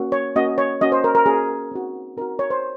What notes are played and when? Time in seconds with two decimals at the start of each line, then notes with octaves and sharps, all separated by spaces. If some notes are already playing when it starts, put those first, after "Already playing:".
Already playing: A#3 C#4 F#4
0.12 C#5
0.35 A#3 C#4 F#4 D#5
0.58 C#5
0.81 A#3 C#4 F#4 D#5
0.92 C5
1.04 A#4
1.15 A#4
1.26 A#3 C#4 F#4 G#4
1.72 C4 D#4 F#4
2.17 C4 D#4 F#4 A#4
2.39 C#5
2.50 C5